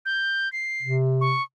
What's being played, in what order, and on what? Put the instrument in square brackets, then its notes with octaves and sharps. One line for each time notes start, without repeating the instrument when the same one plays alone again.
[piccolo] G6
C7
[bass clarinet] C3
[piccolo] C#6